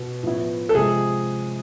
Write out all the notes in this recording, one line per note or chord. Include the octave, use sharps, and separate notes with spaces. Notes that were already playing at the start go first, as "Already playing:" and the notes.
Already playing: B2
A2 F3 B3 E4
A4
C3 F3 G#3 G#4